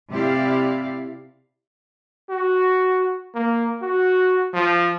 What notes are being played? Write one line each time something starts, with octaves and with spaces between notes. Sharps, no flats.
C3 E4 G4 D5 F5
F#4
A#3
F#4
F3